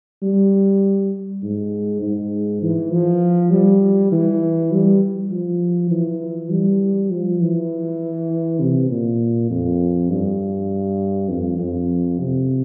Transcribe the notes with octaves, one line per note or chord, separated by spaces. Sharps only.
G3
G#2
G#2
E3
F3
G3
E3
G3
F3
E3
G3
F3
E3
C3
A#2
F2
G2
F2
F2
C3